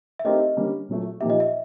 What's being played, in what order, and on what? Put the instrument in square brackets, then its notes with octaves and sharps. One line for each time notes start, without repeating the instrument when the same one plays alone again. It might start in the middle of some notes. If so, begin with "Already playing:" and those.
[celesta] E5
[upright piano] A3 C4 D#4 G4 A#4 [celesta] D#5
[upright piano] D3 G3 A#3 C#4
A#2 F#3 A3
[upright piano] A#2 F3 A#3 D#4 G4 [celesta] E5
[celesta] D#5
E5